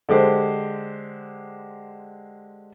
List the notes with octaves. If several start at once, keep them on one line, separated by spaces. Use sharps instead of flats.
D3 G#3 G4 C5